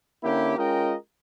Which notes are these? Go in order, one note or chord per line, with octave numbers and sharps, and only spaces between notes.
D3 A#3 C#4 E4 G4
G#3 C#4 F4 A#4 D#5 G5